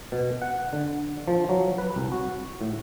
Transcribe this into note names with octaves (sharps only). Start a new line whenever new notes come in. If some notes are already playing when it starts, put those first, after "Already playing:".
B2
F#5
D3
F3
F#3
B4
C2
F#4
A2